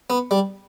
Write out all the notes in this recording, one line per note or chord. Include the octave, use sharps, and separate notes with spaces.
B3
G3